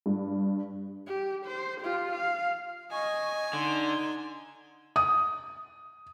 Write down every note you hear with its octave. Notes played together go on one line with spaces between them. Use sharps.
G2
G4
C5
F4 G4
F5
D#5 G#5 C#6
D3 D#4 C6
D#6